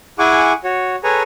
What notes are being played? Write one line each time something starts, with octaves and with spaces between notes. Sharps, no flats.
E4 G#4 F#5 G#5 C#6 D6
F#4 C#5
G#4 A4 B4 C#5 G#5 A#5